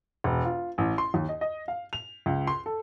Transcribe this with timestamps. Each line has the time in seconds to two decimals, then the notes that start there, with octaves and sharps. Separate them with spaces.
0.24 E1
0.45 F4
0.78 A1
0.98 C6
1.14 D#2
1.29 D#5
1.41 D#5
1.68 F5
1.93 F7
2.26 C#2
2.47 C6
2.66 A4